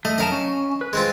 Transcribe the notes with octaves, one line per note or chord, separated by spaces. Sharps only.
A3 D#5
F#2 A#4 D#5 F5 A5
C#4
B4
G#3 C4 F4